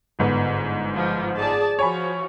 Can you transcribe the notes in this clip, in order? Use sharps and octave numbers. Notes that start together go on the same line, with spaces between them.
G1 G#2 B3
F3
G#4 D5 A5
F3 F#4 C#5 G#5 B5